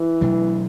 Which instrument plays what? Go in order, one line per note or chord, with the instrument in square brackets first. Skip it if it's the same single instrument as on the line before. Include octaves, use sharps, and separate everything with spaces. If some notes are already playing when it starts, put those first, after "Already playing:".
Already playing: [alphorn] E3
[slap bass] B2 F#3 A3 D4